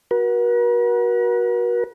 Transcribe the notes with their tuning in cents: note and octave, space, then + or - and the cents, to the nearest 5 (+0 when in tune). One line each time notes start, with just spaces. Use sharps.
F#4 +0 A#4 +45